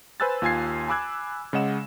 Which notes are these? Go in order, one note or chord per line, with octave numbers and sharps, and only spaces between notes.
B4 C5 G#5 E6 F#6 A6
D#2 F4 G#5 G#6 C7
G#5 B5 D6 E6 F#6 G#6
C#3 G#3 D#5 F#5 E7